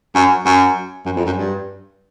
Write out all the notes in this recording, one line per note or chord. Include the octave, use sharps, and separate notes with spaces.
F#2
F#2
F#2
F2
F#2
G2